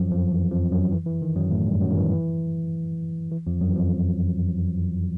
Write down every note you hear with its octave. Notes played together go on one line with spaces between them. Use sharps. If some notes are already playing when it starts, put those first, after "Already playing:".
Already playing: F#2 F3 F#3
F2 F3
E3
F2 F3
F#2 F#3
E3
E3
D#3
F#2 F#3
A2 A3
G2 G3
F#2 F#3
D#3
E3
E3
E3
F2 F3
F#2 F#3
E3
F2 F3